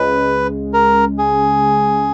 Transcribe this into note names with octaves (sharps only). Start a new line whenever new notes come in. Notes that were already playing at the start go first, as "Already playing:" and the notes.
Already playing: C#2 C#3 G#3 B4
A#4
G#4